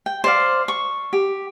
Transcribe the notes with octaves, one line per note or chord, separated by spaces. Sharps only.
G5
C5 D5 F5
C#6
G4